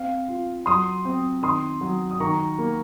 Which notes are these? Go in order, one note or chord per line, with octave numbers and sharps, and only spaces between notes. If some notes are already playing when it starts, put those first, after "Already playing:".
Already playing: C4 F5
F4
F#3 C6 D#6
C4
D#3 C6 D#6
F#3
D#6
D#3 A#5 C#6
A#3